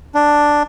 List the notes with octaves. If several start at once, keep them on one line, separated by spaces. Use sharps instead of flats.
D4